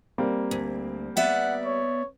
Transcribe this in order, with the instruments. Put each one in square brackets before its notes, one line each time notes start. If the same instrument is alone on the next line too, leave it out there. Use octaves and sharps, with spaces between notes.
[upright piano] G3 A#3 C4
[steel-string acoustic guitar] D2
[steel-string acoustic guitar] B3 D5 E5 [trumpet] F#5
[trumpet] C#5